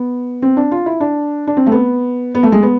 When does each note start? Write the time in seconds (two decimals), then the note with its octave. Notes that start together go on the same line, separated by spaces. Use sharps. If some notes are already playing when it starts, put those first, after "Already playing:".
Already playing: B3
0.42 C4
0.57 D4
0.71 F4
0.86 E4
1.00 D4
1.47 D4
1.57 C4
1.66 A3
1.72 B3
2.35 B3
2.43 A3
2.52 G#3
2.63 B3